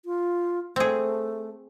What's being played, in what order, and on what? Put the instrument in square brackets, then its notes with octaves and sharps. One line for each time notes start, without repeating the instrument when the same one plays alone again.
[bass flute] F4
[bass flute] A3 [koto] C4 G#4